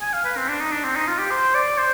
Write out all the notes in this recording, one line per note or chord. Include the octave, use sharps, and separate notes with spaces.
G#5
F5
B4
C4
D4
D#4
D4
C4
D#4
F4
G4
C5
D5
C5